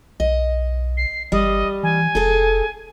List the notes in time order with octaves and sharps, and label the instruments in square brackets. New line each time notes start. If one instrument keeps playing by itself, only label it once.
[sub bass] B1 [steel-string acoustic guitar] D#5
[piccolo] C7
[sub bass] G1 [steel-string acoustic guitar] G3 [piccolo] D#5
[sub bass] E3 [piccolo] G#5
[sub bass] F1 [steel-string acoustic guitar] G#4 A4